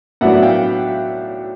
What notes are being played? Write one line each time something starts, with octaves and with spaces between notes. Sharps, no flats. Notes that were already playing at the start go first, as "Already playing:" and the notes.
A2 F#3 B3 D4 E5 F#5
F5 G5